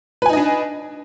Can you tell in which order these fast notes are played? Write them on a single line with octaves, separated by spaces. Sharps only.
B4 G#5 D#4 D#5 D4